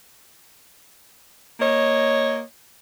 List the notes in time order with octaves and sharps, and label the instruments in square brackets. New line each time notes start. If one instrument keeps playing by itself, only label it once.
[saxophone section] A#3 C#5 D#5